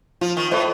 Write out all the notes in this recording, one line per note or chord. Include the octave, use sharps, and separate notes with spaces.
F3 F4
D#3
A2 A4 C5 D#5